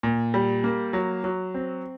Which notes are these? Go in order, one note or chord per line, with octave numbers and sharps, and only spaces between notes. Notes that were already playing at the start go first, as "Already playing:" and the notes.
A#2
G3
A#3
F#3
F#3
C4